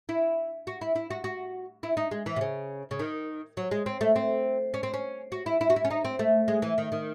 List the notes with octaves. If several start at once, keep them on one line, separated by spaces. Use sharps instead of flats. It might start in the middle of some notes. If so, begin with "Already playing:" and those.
E4
F#4
E4
E4
F#4
F#4
E4
D#4
G#3
E3
C3
C#3
C#3
D#3
F#3
G#3
C4
A3
C4
C#4
C4
C#4
F#4
E4
E4
F#4
E4
C#4
D#4
C4
A3
G#3
E3
D#3
D#3